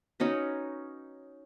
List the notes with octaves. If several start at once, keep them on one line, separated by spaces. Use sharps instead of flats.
C#4 D#4 F#4 B4